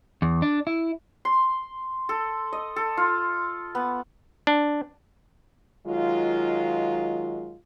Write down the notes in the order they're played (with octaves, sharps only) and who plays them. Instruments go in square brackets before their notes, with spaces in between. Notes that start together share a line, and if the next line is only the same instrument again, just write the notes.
[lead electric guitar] E2
D4
E4
[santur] C6
A4
D#5
A4
F4
B3
[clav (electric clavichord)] D4
[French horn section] D#3 F#3 G#3 F4